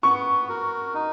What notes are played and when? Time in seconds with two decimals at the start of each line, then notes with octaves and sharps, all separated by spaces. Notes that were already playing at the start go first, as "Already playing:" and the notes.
0.03 B3 C#6
0.48 F#4 A#4
0.94 D#4